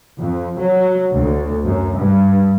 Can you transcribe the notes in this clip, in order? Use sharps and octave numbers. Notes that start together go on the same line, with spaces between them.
F2
F#3
D2
F#2
G2